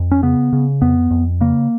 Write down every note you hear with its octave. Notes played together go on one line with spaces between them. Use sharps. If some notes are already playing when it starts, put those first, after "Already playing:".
Already playing: F2
C#4
C#3 B3
C#3
F2 B3
F2
C#3 A#3